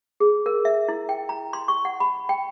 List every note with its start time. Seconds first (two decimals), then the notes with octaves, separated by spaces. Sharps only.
0.20 G#4
0.46 A#4
0.65 E5
0.88 E4
1.09 G5
1.29 A#5
1.53 C6
1.68 C#6
1.85 F#5
2.00 B5
2.29 G5